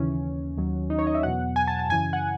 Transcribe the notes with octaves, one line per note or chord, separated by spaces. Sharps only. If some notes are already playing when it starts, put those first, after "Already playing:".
Already playing: D#2 C#3 E3 C#4
D#2 D#3 F#3
D#4
C#5
D#5
E5
E2 B2 F#3 F#5
G#5
A5
A5
F#2 C#3 E3 G#5
F#5